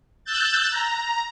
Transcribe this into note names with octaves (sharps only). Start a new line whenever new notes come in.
E6 F#6 G6 A6
A#5